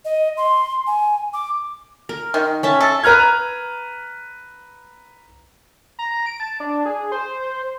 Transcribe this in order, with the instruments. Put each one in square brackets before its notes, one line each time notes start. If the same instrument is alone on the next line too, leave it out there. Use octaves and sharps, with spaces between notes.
[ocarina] D#5
C6
G#5
D6
[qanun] A#4
[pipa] D#3
[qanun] C#4 E5 A5
[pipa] A4
[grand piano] B4 A#5 F6 G#6
[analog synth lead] A#5
D7
A5
D4
G#4
C5